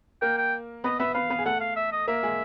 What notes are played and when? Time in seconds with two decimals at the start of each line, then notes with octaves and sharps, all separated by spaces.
0.22 A#3 A#4 G5
0.38 G5
0.84 B3 B4 D#5
0.99 B3 B4 E5
1.14 B3 B4 F5
1.30 B3 B4
1.39 G#4
1.45 A3 A4 F#5
1.61 F5
1.76 E5
1.92 D#5
2.08 A#3 A#4 E5
2.23 G#3 G#4